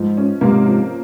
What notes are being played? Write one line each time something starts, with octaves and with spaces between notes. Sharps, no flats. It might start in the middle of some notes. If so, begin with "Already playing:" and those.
Already playing: G#2 F3
C#4
G#2 C3 A#3
F3